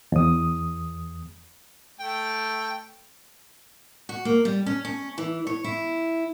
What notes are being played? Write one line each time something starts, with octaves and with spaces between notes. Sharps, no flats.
E2 D#6
A3 G5
F#4
A#3
G3
C#4
C#4
E3
C#5
E4